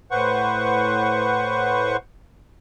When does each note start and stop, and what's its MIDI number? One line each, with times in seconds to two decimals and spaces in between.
0.11 1.97 45
0.11 1.97 71
0.11 1.97 72
0.11 1.97 78
0.11 1.97 85